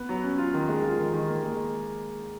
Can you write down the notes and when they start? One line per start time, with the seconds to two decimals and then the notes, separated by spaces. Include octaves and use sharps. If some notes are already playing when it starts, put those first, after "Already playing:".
Already playing: B3
0.09 F#3
0.24 C#4
0.38 F4
0.54 D#3
0.69 G#3
0.83 F4
0.99 D#3
1.13 D#3
1.28 A#3
1.43 G#3